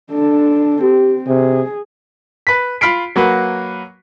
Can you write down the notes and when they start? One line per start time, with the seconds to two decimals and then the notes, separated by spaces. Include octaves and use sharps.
0.12 D4 A4
0.82 C4 G4
1.28 C3 G#4
2.47 B4 B6
2.81 F4 B5 F6 B6 C7 D7
3.16 F#3 A#3 F#4 B4